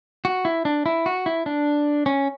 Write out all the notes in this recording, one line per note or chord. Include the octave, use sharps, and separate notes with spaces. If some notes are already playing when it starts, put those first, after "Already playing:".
F#4
E4
D4
E4
F#4
E4
D4
C#4